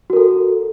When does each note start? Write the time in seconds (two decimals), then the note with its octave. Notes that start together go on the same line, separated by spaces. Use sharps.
0.10 F#4
0.13 A#4
0.16 A4